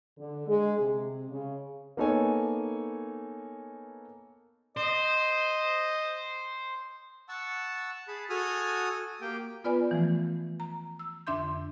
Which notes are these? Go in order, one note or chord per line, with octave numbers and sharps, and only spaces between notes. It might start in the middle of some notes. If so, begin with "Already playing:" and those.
D3
G#3
C3
C#3
A#3 B3 D#4 A4 C#5 G#5
C5 D#5
F#5 A5 C#6 E6
G#4 A5 B5
F#4 A4 G#5 D#6 F6
A#3 G4 G5
B3 F4 B4 D5 G#5 B5
E3 F3 A3
A#5
E6
F2 D3 D4 E5 C6 G6